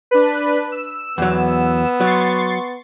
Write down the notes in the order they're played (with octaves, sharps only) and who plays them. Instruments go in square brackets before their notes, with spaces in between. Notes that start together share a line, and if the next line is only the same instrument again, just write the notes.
[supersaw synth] D4 B4
E6
[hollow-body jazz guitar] E2 F#3 [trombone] B3
[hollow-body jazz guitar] F#3 [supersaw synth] C6 C#6 A6